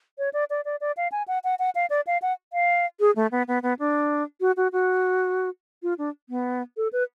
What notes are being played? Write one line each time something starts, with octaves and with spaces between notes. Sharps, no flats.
C#5
D5
D5
D5
D5
F5
G#5
F#5
F#5
F#5
F5
D5
F5
F#5
F5
G#4
A3
B3
B3
B3
D4
F#4
F#4
F#4
F4
D4
B3
A4
B4